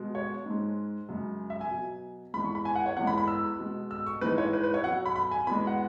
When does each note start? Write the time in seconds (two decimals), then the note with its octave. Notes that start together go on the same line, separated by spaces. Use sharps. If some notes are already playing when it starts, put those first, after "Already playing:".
Already playing: B2 G#3
0.15 C#5
0.46 G#2 G#3
1.09 F#2 C#3 G#3
1.50 E5
1.61 G#5
1.71 B2 F#3
2.34 E2 E3 G#3 B5
2.44 C#6
2.55 B5
2.65 G#5
2.75 F#5
2.86 C#5
2.97 E2 E3 G#3 F#5
3.07 B5
3.18 B5
3.28 E6
3.59 B2 G#3
3.91 E6
4.06 C#6
4.21 G#2 E3 G#3 B4
4.38 C#5
4.53 B4
4.63 B4
4.74 C#5
4.84 B2 F#3 F#5
5.06 B5
5.16 B5
5.31 G#5
5.47 E2 B2 G#3 B5
5.67 F#5